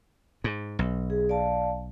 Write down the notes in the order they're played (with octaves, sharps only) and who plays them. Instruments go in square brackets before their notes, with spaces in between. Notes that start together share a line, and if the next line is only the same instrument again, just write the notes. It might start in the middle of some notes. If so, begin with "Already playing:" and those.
[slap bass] G#2
B1
[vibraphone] G#4
D5 F5 A5